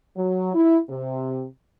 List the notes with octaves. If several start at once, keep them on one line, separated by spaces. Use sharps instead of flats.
F#3
E4
C3